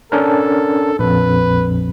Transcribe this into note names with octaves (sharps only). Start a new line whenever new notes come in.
C#4 D4 A4 A#4
A#1 F2 B4